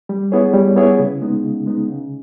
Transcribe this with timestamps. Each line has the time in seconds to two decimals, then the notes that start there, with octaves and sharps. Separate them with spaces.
0.09 G3
0.32 B3 E4 G#4 C#5
0.54 G3
0.76 B3 E4 G#4 C#5
0.99 C#3
1.21 G#3 B3 D#4
1.43 C#3
1.66 G#3 B3 D#4
1.89 C#3